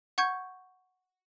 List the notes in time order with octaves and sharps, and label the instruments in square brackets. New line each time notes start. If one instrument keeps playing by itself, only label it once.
[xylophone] F#5 C#6 G6 G#6